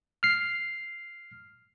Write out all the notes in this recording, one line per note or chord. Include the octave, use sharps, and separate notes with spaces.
F6 C7